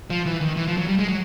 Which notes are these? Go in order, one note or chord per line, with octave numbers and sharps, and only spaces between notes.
F3
E3
D#3
E3
F3
F#3
G3
G#3
F#3